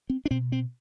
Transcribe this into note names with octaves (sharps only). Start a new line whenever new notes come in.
C4
D4
B2 C4
C4